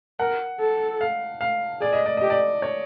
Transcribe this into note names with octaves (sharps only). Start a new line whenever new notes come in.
A#4 F#5
A4
F5
F5
G#4 D5
D#5
D5
G4 D#5
D5
C#5